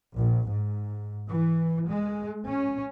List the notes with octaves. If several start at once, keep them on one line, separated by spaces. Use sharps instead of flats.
A#1
G#2
E3
G#3
C#4